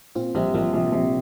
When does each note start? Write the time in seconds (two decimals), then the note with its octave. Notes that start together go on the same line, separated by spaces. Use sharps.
0.15 A#2 C4 F4
0.35 A#1 G3 C4
0.54 A#1 F3 A#3
0.73 A#1 C3 F3
0.86 A#2
0.92 A#1 C3